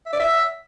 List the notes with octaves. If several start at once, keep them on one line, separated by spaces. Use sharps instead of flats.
E5
D5
E5